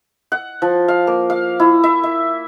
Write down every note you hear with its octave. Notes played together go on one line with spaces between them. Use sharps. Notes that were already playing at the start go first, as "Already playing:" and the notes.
F#5
F3
F5
A#3
F5
E4
E5
E5